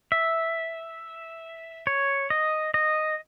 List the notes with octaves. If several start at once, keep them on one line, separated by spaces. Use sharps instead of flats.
E5
C#5
D#5
D#5